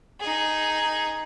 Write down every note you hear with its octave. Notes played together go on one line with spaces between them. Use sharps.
D#4 G#4